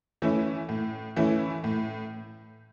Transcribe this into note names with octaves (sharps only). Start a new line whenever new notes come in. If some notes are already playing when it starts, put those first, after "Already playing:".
E3 A3 C#4 E4
A2
E3 A3 C#4 E4
A2